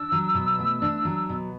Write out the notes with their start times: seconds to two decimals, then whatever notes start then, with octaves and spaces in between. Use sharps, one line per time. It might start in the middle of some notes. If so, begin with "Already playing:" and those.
Already playing: D4 E6
0.12 F#3
0.35 B2
0.59 A3
0.82 D4
1.05 F#3
1.29 B2